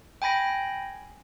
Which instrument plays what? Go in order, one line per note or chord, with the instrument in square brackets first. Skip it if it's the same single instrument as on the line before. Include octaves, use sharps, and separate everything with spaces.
[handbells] G5 G#5 B5 A#6 D7